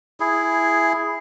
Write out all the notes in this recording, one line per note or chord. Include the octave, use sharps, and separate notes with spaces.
E4 G#4